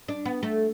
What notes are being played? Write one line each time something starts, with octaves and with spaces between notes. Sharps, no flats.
D4
B3
A3